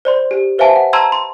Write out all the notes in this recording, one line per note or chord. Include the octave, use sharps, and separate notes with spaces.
C5 D5 C6
G4
B4 C5 E5 F5 G#5 A5
F#5
A5 A#5 C6 E6 G#6
C6